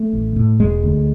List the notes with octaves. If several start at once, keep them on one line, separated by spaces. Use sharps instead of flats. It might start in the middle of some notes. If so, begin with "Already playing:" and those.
Already playing: A3
A1
A2
E1 G#3
D2